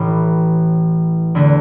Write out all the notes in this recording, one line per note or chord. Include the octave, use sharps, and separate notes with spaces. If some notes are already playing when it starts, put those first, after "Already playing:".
Already playing: A1 A2 E3
E2 D3 A3